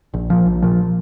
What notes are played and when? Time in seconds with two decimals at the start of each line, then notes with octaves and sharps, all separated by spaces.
0.14 A#1
0.30 A#2 F3
0.46 A#1
0.62 A#2 F3